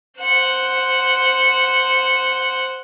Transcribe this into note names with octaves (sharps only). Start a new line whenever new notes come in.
C5 F#5